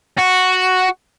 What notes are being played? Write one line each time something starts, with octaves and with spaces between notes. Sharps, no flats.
F#4